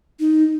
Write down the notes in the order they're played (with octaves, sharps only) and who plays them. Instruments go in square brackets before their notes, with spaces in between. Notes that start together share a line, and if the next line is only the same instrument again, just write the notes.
[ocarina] D#4